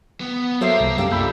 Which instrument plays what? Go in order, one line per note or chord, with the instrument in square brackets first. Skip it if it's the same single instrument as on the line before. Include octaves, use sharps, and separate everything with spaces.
[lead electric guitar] B3
[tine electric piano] F#3 C7 [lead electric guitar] A#3 [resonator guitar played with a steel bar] A4 C5 E5
[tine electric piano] C2
[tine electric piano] F#2 G4 F5 [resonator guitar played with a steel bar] D4 A4
[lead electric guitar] A#2 [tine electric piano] B5 E6 G6